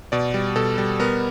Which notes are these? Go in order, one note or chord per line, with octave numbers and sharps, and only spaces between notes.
B2 D5
G3
B2 A4
G3
B3 A#4